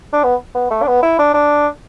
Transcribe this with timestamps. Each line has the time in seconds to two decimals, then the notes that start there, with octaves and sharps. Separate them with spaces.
0.13 D4
0.24 B3
0.55 B3
0.71 A3
0.83 D4
0.87 B3
1.03 E4
1.19 D4
1.34 D4